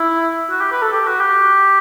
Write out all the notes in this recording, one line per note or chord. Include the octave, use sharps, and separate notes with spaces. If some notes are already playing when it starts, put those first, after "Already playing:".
Already playing: E4
F#4
G4
B4
A4
G4
F#4
G4